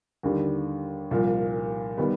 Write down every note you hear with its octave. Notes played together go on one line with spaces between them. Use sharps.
D#2 D3 G3
C2 A#2 F3
D#3 G3 B3